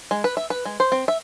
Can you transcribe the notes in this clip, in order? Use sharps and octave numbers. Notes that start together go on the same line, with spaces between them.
G#3
B4
E5
B4
G#3
C5
C4
E5